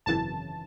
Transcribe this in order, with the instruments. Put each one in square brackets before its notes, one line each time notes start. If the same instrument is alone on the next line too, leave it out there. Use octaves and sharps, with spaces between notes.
[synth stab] G#1 F#2 C#3 E3 A5